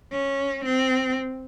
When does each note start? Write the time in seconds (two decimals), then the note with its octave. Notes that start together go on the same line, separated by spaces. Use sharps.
0.12 C#4
0.65 C4